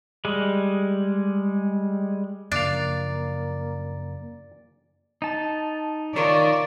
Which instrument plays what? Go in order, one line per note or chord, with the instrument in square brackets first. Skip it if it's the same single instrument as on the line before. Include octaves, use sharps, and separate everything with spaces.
[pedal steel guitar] G3 G#3
[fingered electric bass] F#2 C#3 F3 [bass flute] A#3 [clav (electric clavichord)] D4 F5 [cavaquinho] D5
[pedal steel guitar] D#4 A5
[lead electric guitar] D#3 [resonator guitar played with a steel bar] F4 A#4 C#5 [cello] D5